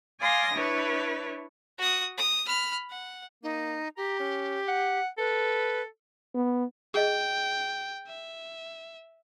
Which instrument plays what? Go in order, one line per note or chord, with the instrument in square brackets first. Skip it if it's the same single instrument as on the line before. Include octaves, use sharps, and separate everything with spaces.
[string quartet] D5 F5 G#5 C6 D#6 A#6
D4 E4 B4 C#5
[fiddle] F#4 D#6
D#6
B5 F6
F#5
[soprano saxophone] A#3 [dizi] D#4
[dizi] G4 [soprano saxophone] A#5
[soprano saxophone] C#4
F#5
[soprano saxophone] A4 [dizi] B4
[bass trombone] B3
[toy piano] G#4 D#5 [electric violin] G5
[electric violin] E5